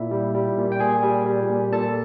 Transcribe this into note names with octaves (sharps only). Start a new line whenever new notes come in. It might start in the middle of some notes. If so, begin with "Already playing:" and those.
Already playing: A#2 E4 E5
G3
G3
A#2
G5
A#2 G#4 G#5
G3
G3
A#2
A#2 A4 A5